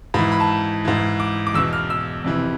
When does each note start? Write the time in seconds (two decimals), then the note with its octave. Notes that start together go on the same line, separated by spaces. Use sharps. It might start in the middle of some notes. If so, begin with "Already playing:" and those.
0.14 G#2 E3 B5
0.32 B5
0.40 A5
0.85 G#2 E3
1.20 D6
1.47 D6
1.54 E2 E6
1.58 B2
1.73 F6
1.90 E6
2.24 F2 C3 E3